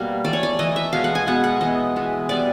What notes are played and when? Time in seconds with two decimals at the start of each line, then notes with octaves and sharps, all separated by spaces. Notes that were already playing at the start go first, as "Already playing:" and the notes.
Already playing: B2 G3 A#3
0.25 E3 A3 D5
0.33 C#5
0.43 D5
0.59 E3 A3 D#5
0.76 E5
0.93 B2 G#3 B3 F5
1.04 F#5
1.15 G#5
1.27 B2 G#3 B3 F#5
1.44 F#5
1.61 E3 G#3 B3 D#5
1.96 E3 G#3 B3
2.29 E3 G3 B3 D5